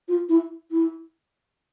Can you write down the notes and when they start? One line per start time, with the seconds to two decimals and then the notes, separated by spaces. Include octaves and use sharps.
0.08 F4
0.29 E4
0.71 E4